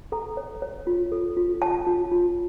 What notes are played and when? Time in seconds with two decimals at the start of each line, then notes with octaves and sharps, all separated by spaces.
0.12 A4 A#5
0.37 C#5
0.62 C#5
0.87 F4
1.12 A4
1.37 F4
1.62 C#5 A5
1.87 F4
2.12 F4